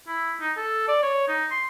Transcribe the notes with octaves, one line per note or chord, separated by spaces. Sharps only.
E4
D#4
A4
D5
C#5
D#4
C6